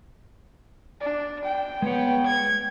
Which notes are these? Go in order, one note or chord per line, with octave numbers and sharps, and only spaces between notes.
D4
G5
G#3 B3 C#5
G#6